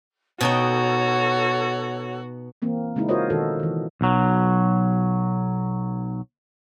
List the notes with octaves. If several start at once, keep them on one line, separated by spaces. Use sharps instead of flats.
B2 D#4 F#4 A4 C#5 G5
E3 A#3 C4
C#3 G#3 C4 D#4 E4
F4 F#4 A#4 C5 C#5 D#5
B2 D#3 F#4 A4
D#3 E3
B1 F#3